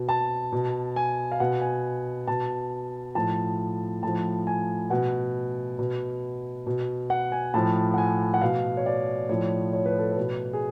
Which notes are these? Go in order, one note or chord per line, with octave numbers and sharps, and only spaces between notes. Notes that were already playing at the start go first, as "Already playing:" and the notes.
Already playing: B2
A5
B2
G#5
F5
B2 F#5
G#5
B2 A5
A2 F3 A5
A2 F3 A5
G#5
B2 F#5
B2
B2
F#5
G#5
A2 F3 A5
F#5
G#5
F#5
B2 F5
C#5
D5
A2 F3 C#5
C#5
B4
A4
B4
B2
G#4